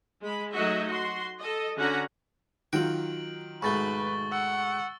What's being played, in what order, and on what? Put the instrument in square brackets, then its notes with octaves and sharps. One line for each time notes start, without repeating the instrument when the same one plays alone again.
[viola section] G#3 B5
F#3 A3 D#4 F#4 D#5 E5
F#4 C6
A4 D#5
D3 C#4 F#4 F#5 A#5
[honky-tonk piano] D#3 F#3 F4 [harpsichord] F#4 G5 [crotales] D7 F#7
[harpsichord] G#2 B2 A3 [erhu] B4 [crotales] C#6 A6 G7
[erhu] F#5 [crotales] E6